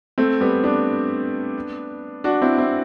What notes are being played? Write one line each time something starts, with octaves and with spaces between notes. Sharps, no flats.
A3 C4
G3 B3
B3 D4
D4 F#4
C4 E4
C4 E4